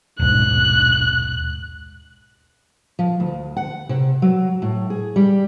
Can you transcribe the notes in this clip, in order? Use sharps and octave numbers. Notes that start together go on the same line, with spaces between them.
D#1 B1 G#2 F#6
F3
D2
F#5
C3
F#3
A2
G#4
G3